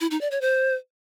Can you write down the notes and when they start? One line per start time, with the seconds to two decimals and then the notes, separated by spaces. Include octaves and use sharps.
0.01 E4
0.11 D#4
0.21 D5
0.31 C#5
0.41 C5